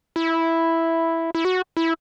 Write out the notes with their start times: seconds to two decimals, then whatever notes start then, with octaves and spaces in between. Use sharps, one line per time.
0.16 E4
1.35 E4
1.45 F#4
1.77 E4